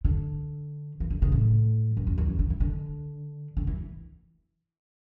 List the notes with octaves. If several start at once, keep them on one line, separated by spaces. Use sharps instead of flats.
D3
E3
D3
C#3
A2
F#2
F#2
E2
F#2
D3
E3
D3
D3
E3